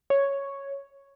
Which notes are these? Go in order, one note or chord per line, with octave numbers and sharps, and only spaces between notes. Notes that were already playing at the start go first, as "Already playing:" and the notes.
C#5